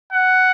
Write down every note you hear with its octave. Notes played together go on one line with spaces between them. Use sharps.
F#5